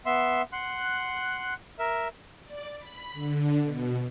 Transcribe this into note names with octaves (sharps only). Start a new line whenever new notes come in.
B3 E5 C6
F#5 C6 F#6
A#4 E5
D5
B5
D3
B2